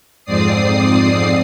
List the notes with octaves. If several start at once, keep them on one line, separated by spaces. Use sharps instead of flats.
F2 G#2 C4 D5 D#6 C7